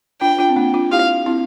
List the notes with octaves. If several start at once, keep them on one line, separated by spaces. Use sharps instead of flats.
D4 F4 G5
D4 F4
C4
A#3 D4
D4 F4
E4 G4 F5
C4 E4